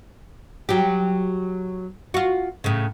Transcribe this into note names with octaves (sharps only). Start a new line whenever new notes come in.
F#3 G4
F4 F#4
A2 C#3